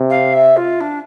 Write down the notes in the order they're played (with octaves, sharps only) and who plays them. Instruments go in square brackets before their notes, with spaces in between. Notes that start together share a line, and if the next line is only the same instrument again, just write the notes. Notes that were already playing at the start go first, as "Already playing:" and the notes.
Already playing: [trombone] C3
[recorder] F5
E5
F4
D4